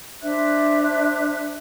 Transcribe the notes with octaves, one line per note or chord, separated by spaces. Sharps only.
D4 C5 E5 F#6